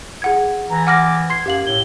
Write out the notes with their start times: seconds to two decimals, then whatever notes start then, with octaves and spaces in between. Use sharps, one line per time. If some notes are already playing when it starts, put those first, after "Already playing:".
0.22 G#4 F#5 G#6
0.70 E3 A#5
0.87 F#5 D6 F6 A#6
1.30 C6 G#6 C7
1.46 F#2 G4 F5 F#7
1.66 A2 G7